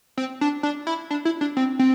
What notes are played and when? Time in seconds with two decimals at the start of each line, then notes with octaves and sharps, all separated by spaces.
0.17 C4
0.41 D4
0.63 D4
0.87 E4
1.11 D4
1.25 E4
1.41 D4
1.57 C4
1.79 C4